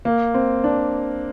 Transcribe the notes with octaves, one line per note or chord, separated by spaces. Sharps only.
A#3
C4
D4